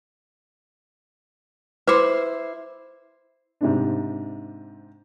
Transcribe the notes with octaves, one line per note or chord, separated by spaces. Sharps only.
E4 B4 C5 D6
G#2 C3 D4